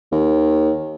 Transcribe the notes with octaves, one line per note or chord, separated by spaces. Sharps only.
D#2